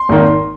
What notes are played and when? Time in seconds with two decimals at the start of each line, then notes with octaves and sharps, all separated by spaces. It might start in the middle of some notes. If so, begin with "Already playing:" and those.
Already playing: C6
0.09 G#1 G#2 D#3 A#3